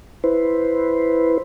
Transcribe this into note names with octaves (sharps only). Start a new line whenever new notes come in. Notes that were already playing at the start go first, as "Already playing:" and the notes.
E4 B4 C5